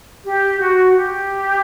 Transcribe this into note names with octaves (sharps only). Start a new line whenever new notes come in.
G4
F#4
G4